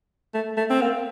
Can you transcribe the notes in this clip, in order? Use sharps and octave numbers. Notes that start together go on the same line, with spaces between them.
A3
A3
C4
A#3